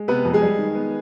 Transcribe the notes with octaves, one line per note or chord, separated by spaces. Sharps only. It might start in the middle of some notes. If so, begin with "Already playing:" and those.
Already playing: G#3
C3 B3 B4
F2
G#3 G#4
G3
D#3
B3